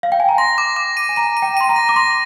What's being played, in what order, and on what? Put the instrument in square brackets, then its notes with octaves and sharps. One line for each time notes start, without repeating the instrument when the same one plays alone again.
[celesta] F5
G5
G#5
A#5
[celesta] C6 [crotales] A#6
[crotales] D6
D6
D#7
[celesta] G#5
[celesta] A#5 [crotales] D#7
[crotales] D#7
[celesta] G5
[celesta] C6 [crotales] D#7
[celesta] A#5
[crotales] A#6
[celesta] D6
[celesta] C6 [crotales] A#6